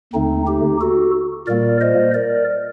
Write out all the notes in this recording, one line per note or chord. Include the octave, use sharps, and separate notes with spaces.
D#2 D3 A3 C4 D#4
D#4 G4
F#4 A4
A#2 G3 A#3 A#4 D5
C5 D#5
A#4 D5